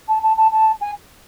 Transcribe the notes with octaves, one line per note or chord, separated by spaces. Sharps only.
A5
A5
A5
A5
G#5